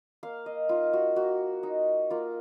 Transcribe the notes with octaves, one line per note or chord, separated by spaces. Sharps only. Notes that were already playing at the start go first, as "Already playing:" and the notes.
A#3 F5
D#5
D#4 F4
F#4
A#3 F#4
D#4
A#3 F4